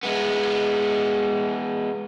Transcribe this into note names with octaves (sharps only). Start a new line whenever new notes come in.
G#3 B3